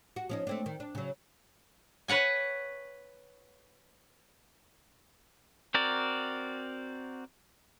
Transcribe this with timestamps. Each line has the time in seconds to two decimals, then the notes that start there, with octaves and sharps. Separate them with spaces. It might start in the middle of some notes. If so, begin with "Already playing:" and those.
0.16 F#4
0.29 F3 C#4 D#4
0.47 A3 C4 D4
0.66 D#3
0.80 D4
0.95 C#3 F#3
2.08 B4 C#5 F#5 G#5
5.74 C4 F#4 A#4 D5